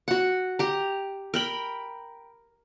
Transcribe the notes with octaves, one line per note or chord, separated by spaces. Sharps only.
F#4 F#5
G4 A#5
A#4 G5 B5